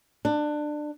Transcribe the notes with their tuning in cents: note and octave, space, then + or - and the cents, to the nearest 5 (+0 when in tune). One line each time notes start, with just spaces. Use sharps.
D4 +20